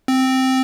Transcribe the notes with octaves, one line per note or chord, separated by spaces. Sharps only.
C4